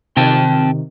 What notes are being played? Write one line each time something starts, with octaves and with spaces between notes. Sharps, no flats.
C3 D#3 C4 G5 A5